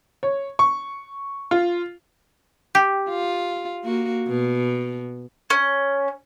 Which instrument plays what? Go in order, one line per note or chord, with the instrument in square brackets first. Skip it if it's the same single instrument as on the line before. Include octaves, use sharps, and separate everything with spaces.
[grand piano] C#5
C#6
F4
[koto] G4
[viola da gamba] F4
A#3 F#4
B2
[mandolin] C#4